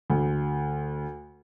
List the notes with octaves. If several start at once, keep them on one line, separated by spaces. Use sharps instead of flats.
D2